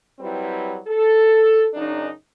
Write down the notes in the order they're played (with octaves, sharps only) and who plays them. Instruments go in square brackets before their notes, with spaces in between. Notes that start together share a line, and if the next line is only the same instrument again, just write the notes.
[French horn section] F#3 G3 C4 E4 B4
A4
F#2 C#3 D4 D#4